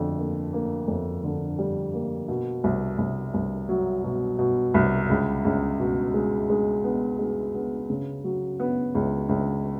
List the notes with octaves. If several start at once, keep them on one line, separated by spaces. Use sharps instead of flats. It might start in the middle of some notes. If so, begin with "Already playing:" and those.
Already playing: F2 D3
A#3
A#3
F2
D3
G3
A#3
B2
C2
C2
C2
F#3
B2
B2
C2
C#2
C#2
B2
G#3
G#3
B3
G#3
B3
C#3
F#3
B3
C#2
C#2